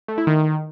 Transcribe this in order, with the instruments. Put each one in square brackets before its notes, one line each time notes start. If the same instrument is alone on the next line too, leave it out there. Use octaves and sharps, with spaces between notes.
[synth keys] A3
E4
D#3